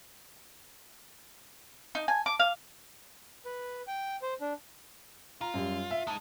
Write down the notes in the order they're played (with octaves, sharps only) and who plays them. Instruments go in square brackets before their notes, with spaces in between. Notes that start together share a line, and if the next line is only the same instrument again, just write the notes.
[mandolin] D#4
G#5
D6
F5
[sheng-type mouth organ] B4
G5
C5
D4
[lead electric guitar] F4 [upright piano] A#5
[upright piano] F#2 G3
E5
[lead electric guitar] G#3 D#4 [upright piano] A5